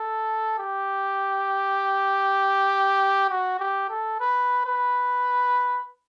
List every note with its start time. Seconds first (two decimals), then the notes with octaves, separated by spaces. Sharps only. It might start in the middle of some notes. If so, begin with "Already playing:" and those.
Already playing: A4
0.58 G4
3.30 F#4
3.59 G4
3.89 A4
4.20 B4
4.65 B4